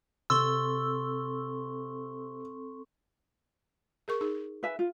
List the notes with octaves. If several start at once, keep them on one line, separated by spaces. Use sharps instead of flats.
C3 C4 A4 C6 C#6 E6 G7
G#4 A#4 C#6
D#4 G#4
B4 E5 G#5
F4